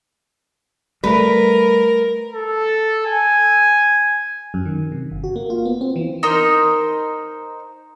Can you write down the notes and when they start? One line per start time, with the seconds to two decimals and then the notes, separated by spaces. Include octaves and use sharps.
1.04 G3 A3 A#4 B4
2.33 A4
3.07 G#5
4.54 F#2
4.65 D#3
4.92 C3
5.11 G1
5.24 F#4
5.36 A#3
5.50 F4
5.65 B3
5.81 C4
5.96 E3
6.23 D#4 A#4 C5